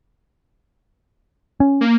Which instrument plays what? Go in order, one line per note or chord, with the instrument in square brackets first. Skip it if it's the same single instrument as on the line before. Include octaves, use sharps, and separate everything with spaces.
[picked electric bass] C#4
[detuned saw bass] A#3